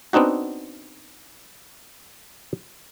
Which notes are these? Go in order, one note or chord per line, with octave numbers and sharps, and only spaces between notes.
B3 C4 D4 D#4 F#4